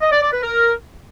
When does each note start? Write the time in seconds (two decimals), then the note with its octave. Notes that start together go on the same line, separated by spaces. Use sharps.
0.01 D#5
0.11 D5
0.22 D5
0.32 B4
0.43 A#4